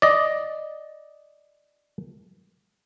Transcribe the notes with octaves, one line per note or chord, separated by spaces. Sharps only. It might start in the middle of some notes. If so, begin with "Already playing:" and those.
D5 D#5